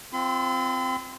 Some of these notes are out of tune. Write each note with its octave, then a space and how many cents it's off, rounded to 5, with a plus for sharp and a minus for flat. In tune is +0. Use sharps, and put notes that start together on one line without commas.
C4 +0 F4 +0 C6 -45